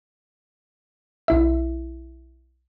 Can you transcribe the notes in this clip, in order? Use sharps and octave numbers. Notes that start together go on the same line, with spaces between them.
B1 E4 E5